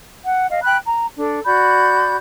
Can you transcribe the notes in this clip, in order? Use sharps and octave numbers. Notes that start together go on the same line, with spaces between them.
F#5
D#5 F5
G5 B5 F#6
A#5
D4 A4
F#4 D5 B5 G6